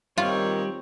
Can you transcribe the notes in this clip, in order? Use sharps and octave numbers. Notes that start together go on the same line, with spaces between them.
A#2 D#3 G3 C4 F4 C#5